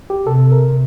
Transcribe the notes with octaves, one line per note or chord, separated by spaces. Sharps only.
G4
C3 A4
A#4